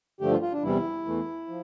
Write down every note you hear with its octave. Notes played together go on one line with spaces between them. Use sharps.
G2 D3 F3 A3 G4
F4
F4
D4
E2 C3 E3 G3 E4
E2 E3 A3
F3